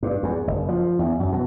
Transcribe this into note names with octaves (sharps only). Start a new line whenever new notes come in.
G2
E2
F#1
F3
E2
F#2
B2